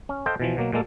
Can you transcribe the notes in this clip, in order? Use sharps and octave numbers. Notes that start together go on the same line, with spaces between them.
C#4
A4 C5 D#5 F5 G5
B2 E3 F3
B2 F#3 A#3
A#2 G#3 A#3 A4